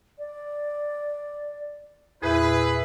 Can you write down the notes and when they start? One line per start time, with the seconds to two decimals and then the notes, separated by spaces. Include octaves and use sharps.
0.18 D5
2.22 E2 A#2 E4 G#4 B4 G6